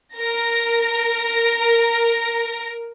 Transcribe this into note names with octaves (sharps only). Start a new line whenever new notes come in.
A#4 A#6